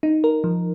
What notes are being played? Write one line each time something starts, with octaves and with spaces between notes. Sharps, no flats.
D#4
A#4
F3